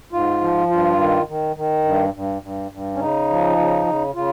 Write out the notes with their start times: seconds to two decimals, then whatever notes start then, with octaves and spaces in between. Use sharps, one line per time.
0.12 G#2 F4
0.41 F3
0.70 G2 F4
0.99 D#3
1.27 D#3
1.56 D#3
1.85 G2
2.14 G2
2.42 G2
2.71 G2
2.95 C#4
3.00 C#3 D#4
3.29 F3
3.58 C#3
3.86 C#3
4.15 C#3 F4